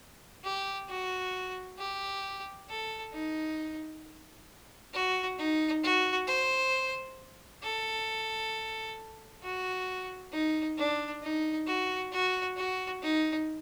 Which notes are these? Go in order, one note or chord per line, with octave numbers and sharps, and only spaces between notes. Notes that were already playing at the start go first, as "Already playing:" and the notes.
G4
F#4
G4
A4
D#4
F#4
D#4
F#4
C5
A4
F#4
D#4
D4
D#4
F#4
F#4
F#4
D#4